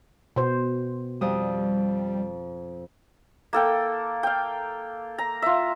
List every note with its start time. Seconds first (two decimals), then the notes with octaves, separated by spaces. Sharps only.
0.36 B2 C5
1.21 F2 G3 D#6
3.53 A#3 A4 G5
4.23 F5 G5
5.18 A#5
5.42 F4 E5